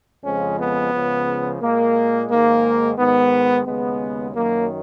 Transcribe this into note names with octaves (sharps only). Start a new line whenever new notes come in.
F2 C#3 F3 G#3 C#4
B3
C#2 C#3 F3
A#2 G#3 A#3
G#2 D#3 G#3 A#3
G#2 D#3 G#3 B3
D#2 C#3 G#3 B3
F#2 D#3 F#3 A#3